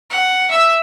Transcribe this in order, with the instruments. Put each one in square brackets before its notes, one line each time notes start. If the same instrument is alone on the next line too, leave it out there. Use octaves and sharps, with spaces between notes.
[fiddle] F#5
E5 E6